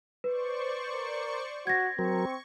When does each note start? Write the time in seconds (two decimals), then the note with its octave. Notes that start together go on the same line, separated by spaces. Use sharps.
0.24 B4 C5 D5 C#6
0.92 A#4
1.67 F#4 G#6 A#6
1.99 F#3 C4 A#4 C#6